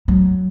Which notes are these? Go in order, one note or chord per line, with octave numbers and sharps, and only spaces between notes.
F#3